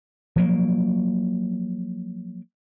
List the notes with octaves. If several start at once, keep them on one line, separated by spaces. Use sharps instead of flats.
F3 F#3 A#3